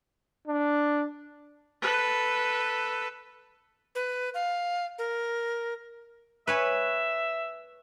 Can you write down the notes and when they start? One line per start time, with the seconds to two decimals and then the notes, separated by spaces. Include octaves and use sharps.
0.47 D4
1.82 A4 B4
3.95 B4
4.34 F5
4.98 A#4
6.47 B4 C#5 E5 G#5